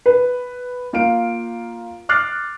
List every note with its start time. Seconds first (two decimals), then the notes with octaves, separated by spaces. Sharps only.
0.06 B4
0.93 A#3 F4 F5 D7
2.09 D6 F6 F#6 A6 C7